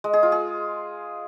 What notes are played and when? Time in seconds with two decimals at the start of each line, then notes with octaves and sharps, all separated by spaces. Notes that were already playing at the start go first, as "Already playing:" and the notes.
0.04 G#3
0.13 G#4
0.23 F4
0.32 G#4